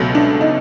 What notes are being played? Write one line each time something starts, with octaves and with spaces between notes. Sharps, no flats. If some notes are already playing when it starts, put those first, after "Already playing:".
Already playing: C#2 B2 F#3 A3
D4
D#4